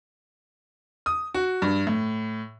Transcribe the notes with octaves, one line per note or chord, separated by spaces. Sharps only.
D#6
F#4
G2
A2